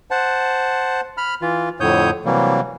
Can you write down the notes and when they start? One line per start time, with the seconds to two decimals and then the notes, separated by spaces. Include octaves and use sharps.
0.11 C5 F#5 A5
1.17 B5 F6
1.42 E3 F4
1.80 F2 A2 D3 C#5 D#6 G6
2.25 C3 E3 F#3 G3 A#3